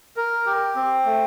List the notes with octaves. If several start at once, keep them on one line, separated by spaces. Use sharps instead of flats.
A#4
G4
C4
A3